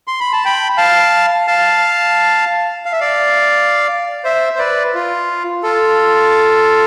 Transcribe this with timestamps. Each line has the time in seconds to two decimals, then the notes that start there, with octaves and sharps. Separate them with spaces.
0.07 C6
0.20 B5
0.33 A5
0.45 G5 B5
0.78 F5 A5
1.47 F5 A5
2.85 F5
2.92 E5
3.00 D5 F5
4.24 C5 E5
4.55 C5
4.59 B4 D5
4.95 F4
5.63 F4 A4